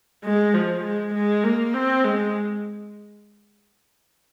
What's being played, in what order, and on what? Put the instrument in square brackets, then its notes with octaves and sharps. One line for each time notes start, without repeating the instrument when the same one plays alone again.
[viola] G#3
F3
G#3
G#3
A#3
C4
G#3